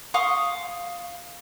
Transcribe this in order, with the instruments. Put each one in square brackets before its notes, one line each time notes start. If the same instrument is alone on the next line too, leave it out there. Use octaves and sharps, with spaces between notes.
[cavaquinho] F5 C6 C#6 D#6